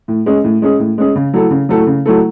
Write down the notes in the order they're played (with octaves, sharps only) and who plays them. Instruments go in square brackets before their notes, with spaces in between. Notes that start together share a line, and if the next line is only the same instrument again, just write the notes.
[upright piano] A2
G#3 C#4 G#4
A2
G#3 C#4 G#4
A2
G#3 C#4 G#4
C#3
F#3 A3 E4 A4
C#3
F#3 A3 E4 A4
C#3
F#3 A3 E4 A4